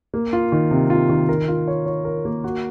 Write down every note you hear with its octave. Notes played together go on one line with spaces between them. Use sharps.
A#3
F4
D#3
C3
F4
D#3
A#4
F4
C#5
C#5
A#4
A#3
F#4